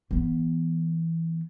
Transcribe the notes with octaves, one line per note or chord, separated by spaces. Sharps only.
E3 B3